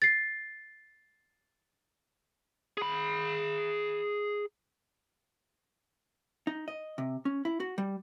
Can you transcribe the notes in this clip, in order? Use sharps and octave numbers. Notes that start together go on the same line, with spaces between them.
A6 C7
G#4 B5
D#4
D#5
C3
C#4
E4
F#4
G3